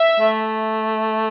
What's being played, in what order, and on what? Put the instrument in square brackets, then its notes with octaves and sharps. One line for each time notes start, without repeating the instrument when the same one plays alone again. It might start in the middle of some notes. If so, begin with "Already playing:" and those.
Already playing: [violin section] E5
[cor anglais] A3